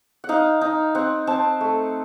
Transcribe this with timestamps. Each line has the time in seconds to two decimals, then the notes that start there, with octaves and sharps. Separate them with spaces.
0.24 F#5
0.29 D#4 F5
0.61 D#4
0.95 C4 F#5
1.27 C4 A5
1.61 A3